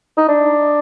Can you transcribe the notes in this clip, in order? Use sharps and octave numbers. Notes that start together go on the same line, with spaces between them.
D#4
D4